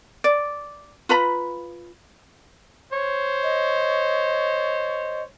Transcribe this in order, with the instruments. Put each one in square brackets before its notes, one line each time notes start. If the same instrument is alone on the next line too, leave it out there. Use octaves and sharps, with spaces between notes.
[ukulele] D5
F4 B4 A#5 B5
[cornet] C5 [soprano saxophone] C#5
[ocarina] D#5